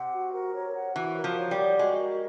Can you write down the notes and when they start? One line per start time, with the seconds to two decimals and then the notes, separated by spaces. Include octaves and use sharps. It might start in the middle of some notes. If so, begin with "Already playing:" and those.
Already playing: C3 F#5
0.13 F#4
0.33 A#4
0.55 C#5
0.75 F#5
0.96 E3 F#4
1.17 A#4
1.24 F3
1.37 C#5
1.51 G3
1.57 F#5
1.79 G#3 F#4
1.99 A#4